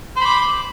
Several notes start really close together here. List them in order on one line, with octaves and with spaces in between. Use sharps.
C5 B5 D6